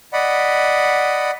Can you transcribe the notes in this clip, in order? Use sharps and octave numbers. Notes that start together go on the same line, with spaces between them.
D5 D#5 F#5 B5